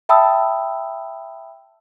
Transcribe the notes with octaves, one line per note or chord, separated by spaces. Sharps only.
E5 G5 A5 B5 D#6 E6